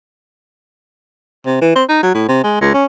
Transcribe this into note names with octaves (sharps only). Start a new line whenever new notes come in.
C3
E3
C4
D#4
F#3
A2
C3
G#3
C#2
C#4